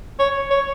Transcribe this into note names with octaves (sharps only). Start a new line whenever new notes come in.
C#5
C#5